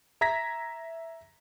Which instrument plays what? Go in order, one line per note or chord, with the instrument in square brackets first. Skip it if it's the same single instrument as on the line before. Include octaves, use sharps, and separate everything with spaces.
[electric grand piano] E5 A#5 G#6 A#6 B6